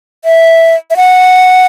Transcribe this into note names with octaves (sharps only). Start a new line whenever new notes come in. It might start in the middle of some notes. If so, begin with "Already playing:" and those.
E5
E5
F#5